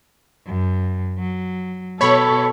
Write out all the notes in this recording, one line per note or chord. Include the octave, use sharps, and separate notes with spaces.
F#2
F#3
B2 A4 C#5 B5 C#6